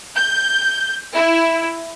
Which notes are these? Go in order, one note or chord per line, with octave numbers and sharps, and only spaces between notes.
G6
E4